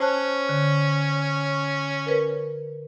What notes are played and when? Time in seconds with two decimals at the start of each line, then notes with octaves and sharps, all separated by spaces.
0.01 C#4 C5 A5 F#6
0.49 D3
2.06 A#4 B4